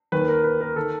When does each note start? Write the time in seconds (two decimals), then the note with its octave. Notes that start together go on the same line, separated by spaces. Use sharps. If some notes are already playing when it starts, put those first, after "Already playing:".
0.12 D#2 D#3 B4
0.28 A#4
0.44 B4
0.61 A#4
0.76 D#3 A4